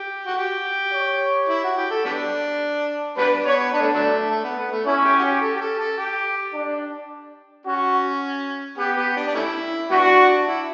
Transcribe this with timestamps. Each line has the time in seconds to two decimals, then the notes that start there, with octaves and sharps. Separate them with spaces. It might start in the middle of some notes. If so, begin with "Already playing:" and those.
Already playing: G4
0.26 F#4
0.37 G4
0.93 C#5
1.49 E4
1.64 F#4
1.77 G4
1.91 A4
2.05 G3 B3 D4
3.17 G3 B3 D4 B4
3.45 B3 C#5
3.73 B3 D4
3.80 A3
3.94 D3 F#3 A3
4.30 A3
4.44 B3
4.58 B3
4.71 A3
4.86 C#4 E4
5.04 G4
5.19 F#4
5.22 G4
5.41 A4
5.56 G4
5.60 A4
5.79 A4
5.97 G4
6.54 D4
7.66 C#4 F#4
8.78 B3 G4
8.97 B3
9.16 D4
9.28 D4
9.35 A3 C#4 E4
9.91 G3 B3 D4 F#4
10.46 E4